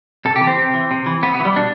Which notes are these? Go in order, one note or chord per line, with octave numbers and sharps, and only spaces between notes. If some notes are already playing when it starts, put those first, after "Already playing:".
C3 A4
G4
E3
C4
C3
E3
C3
E3
C3 B3
B3
E3
G3
B2 D4